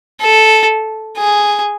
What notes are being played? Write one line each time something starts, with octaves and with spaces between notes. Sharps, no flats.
A4
G#4